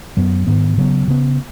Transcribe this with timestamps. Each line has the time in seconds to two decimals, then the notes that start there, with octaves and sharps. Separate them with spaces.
0.17 F#2 F#3 B3
0.47 G#2 D#3 B3
0.77 C#3 F#3 B3
1.08 C#3 B3